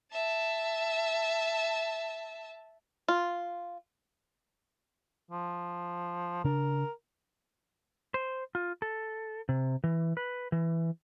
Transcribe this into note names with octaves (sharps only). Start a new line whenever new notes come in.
E5 A5
F4
F3
C#3 D4 A#4
C5
F4
A4
C3
E3
B4
E3